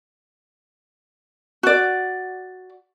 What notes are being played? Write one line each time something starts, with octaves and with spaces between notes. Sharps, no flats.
F#4 D5